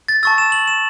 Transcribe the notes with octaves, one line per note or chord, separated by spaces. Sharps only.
A6
A5 C#6 E6 A6
E7
F#7
E7